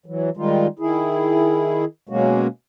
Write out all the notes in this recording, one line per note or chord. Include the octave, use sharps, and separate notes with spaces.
E3 F#3
D#3 G3 G#3 D#4 F4
D#3 E4 G#4
B2 F#3 G#3 A#3 C#4 F#4